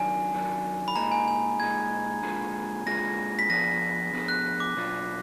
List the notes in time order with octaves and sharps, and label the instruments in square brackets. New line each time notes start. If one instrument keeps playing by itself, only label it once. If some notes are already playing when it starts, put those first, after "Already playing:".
Already playing: [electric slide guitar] F#2 D#3 F#3 D4 [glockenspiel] G#5
[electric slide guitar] F#2 D#3 F#3 D4
[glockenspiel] B5
[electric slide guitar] A#2 G#3 D#4 [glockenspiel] A#5
[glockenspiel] G#5
G#5
[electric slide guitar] A#2 G#3 D#4 [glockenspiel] G#6
[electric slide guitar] A#2 G#3 D4 F4 G#4
[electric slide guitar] A#2 G#3 D4 F4 G#4 [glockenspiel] A#6
[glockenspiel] B6
[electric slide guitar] F3 B3 D4 G#4 [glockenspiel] A#6
[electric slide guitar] F3 B3 D4 G#4
[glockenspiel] F#6
D6
[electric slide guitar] B2 F#3 D4 F4